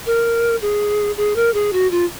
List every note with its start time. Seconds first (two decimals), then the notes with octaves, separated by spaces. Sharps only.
0.06 A#4
0.62 G#4
1.17 G#4
1.36 A#4
1.54 G#4
1.73 F#4
1.91 F4